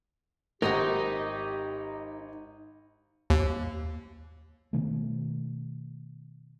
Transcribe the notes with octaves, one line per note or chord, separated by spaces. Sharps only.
G#1 D#4 G4 A#4 D#5 F#5
D#2
B2 D#3 A3